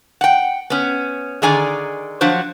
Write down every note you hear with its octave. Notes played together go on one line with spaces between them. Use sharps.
F#5 G5
B3 C#4
D3 D#3 G#4 D5 G#5 A#5
F3 F#3 D4 F#4 C5